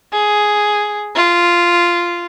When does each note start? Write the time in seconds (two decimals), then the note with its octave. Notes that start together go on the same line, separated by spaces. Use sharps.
0.13 G#4
1.15 F4